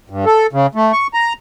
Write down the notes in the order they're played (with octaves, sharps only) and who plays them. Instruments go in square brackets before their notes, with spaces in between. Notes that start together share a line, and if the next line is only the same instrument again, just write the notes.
[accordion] G2
A4
C#3
A3
C#6
A#5